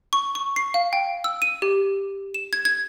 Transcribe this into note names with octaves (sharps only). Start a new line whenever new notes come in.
C#6
C#6
C7
F5
G5
E6
D#7
G4
E7
G#6
G#6